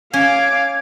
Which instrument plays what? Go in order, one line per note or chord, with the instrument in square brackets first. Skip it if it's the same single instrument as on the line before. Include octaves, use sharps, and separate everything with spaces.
[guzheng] C#4 [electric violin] F5 D6 [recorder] G#6